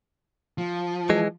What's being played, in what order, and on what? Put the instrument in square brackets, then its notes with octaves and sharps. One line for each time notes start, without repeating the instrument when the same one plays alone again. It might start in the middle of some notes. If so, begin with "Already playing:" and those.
[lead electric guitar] F3
[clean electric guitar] E3 G#3